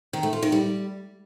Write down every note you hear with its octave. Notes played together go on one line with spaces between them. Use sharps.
D#3
A3
F4
D#3
G3